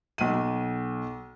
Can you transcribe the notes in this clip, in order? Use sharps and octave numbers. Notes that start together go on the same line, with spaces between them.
B1 D#7